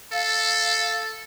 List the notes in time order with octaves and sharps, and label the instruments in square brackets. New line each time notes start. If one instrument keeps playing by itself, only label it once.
[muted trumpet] A4 [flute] F5